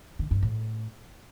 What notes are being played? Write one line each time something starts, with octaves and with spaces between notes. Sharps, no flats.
D3
G2
A2